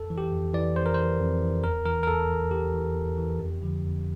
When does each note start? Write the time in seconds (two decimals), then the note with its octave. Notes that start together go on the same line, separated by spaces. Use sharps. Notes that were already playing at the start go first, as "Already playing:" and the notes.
Already playing: F2 A4
0.10 E3
0.18 G4
0.32 F2
0.54 E3 D5
0.76 F2 C5
0.86 A#4
0.94 E3 C5
1.20 F2
1.42 E3
1.64 E2 A#4
1.85 E3 A#4
2.03 A#4
2.07 E2 A4
2.30 E3
2.51 E2 G4
2.74 E3
2.95 E2
3.18 E3
3.39 F2
3.62 D3 F3
3.84 F2